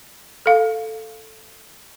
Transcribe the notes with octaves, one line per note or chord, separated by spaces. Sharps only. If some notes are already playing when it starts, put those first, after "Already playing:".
A4 F5